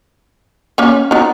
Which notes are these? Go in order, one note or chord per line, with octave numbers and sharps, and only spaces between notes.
A#3 C#4
B3 D#4